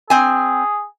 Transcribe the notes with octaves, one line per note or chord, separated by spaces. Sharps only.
C4 G#4 G#5